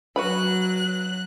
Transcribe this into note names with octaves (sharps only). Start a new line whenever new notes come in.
F#3 F#4 B4 B5 F#6